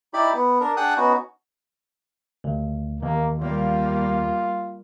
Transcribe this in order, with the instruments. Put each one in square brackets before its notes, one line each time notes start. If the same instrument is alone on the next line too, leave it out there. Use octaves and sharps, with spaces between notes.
[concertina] D#4 E4 G4 D5 B5
B3
D4 A#4
D4 G#4 F#5 G5 D#6 F#6
B3 C#4 D#4 F#4
[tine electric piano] D2
[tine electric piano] D#2 [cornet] A#3
[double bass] G3 A#3 [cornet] F4